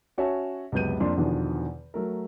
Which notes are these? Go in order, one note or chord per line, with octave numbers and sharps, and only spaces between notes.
C#4 F#4 C#5 E5 G#5 A5
C#2 F#2 C3 B3 G6 D#7
F2 A#3 D4 C6
E2 B2 D3 D#3 F3
F#3 A3 A#4